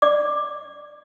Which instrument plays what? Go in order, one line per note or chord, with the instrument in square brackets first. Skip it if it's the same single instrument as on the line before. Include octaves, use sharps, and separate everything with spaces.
[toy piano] D5 D6